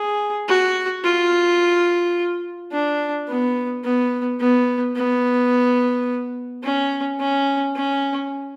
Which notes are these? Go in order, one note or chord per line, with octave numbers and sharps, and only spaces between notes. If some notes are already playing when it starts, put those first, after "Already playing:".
Already playing: G#4
F#4
F4
D4
B3
B3
B3
B3
C#4
C#4
C#4